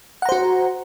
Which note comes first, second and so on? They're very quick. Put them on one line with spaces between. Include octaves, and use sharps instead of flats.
F#5 A#5 C5 F#4